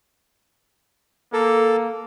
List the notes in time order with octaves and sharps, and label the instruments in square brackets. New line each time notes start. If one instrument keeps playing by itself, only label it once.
[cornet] A#3 [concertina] A4